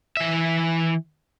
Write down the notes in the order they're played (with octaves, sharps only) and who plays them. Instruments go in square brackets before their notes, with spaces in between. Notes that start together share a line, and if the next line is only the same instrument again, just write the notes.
[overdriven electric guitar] E3 E5